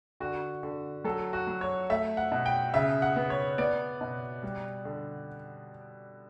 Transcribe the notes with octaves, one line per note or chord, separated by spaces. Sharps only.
D3 F#4
D3
F#3 A4
F#4
F#3
C#5
A3 E5
F#5
B2
G5
C#3 E5
F#5
B3
C#5
B3 D5
B2
G3
D3